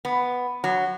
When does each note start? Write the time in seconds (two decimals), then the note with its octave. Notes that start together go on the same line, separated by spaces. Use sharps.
0.05 B3
0.64 F#3